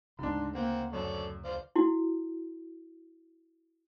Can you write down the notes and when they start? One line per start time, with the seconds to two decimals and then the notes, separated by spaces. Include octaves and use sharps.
0.19 D2 G#2 C#3 D4 C6
0.55 A#3 C4 F#5
0.93 F#2 A4 C#5 D5
1.45 C5 D5 F5
1.76 E4 F#4